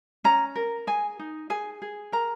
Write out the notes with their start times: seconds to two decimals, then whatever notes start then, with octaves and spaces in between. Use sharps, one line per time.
0.24 C#4 A#5
0.55 A#4
0.87 G#4 G#5
1.19 D#4
1.50 G#4 G#5
1.82 G#4
2.12 A#4 A#5